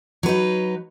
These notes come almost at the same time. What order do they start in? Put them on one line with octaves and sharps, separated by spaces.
F#3 B4 D#4